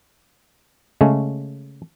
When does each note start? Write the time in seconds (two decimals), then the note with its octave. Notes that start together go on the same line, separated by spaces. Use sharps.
1.01 C#3 G#3 A3 C#4